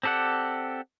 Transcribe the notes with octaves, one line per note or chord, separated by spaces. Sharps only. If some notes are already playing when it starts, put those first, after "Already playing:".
C4 G4 A4 D5 F#5